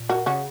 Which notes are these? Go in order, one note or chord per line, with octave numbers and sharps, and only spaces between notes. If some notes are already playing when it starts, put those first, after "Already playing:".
Already playing: A#2
F#4 A#4
C#3 C#4 F#4